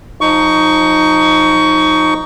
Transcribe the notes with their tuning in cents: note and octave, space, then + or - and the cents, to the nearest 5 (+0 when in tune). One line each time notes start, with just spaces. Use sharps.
F3 +30 D#4 +0 C#6 +20